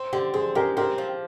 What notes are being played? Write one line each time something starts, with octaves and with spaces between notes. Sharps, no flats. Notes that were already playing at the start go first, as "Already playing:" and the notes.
Already playing: C4
D3 G4
C4 G#4
G#3 G4 A#4
C4 G4 A#4
F3